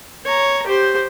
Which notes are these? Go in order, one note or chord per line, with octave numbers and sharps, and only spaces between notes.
C#5 A#5
G4 C5